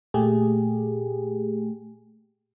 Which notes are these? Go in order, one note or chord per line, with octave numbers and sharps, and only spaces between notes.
A#2 A3 G4 G#4